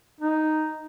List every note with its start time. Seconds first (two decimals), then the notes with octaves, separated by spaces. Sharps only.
0.20 D#4